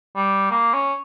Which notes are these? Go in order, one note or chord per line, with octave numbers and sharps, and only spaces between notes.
G3
A#3
C#4